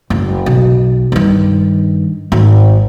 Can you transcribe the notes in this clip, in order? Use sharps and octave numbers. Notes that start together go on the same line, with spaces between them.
F#1
B1
G2 D#3
G#1